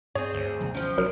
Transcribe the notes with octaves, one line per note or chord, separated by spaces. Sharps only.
G2 C4 G#4 C#5
D2
B2 D3 F#3
F3 C#4 G5
B1 F#3 A#4